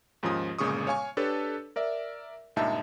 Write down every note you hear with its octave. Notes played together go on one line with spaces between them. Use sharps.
D#2 G#2 F3 C#4 F4 D#6
G1 A#2 C#3 G#3 C#6 D#6
C#5 F5 G#5 C#6
D4 G4 A4 B4 C#5
A#4 D5 E5
C#2 G2 A#2 D#4 E5 A5